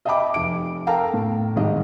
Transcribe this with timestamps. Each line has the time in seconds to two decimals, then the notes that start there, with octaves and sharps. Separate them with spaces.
0.05 D#5 E5 G5 A5 B5 D6
0.34 F1 D7
0.87 A4 A#4 F5 G5 A5 A#5
1.14 A2
1.56 C2 G#2 D#3 G4 D#5